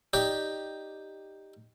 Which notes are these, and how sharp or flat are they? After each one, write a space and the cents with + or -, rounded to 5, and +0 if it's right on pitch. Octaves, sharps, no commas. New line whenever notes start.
D#4 +0 G4 +0 D5 +0